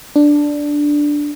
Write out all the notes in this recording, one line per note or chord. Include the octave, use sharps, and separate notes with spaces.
D4